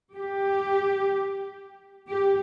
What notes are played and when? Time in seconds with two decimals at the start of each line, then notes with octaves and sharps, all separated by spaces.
0.17 G4
2.07 G4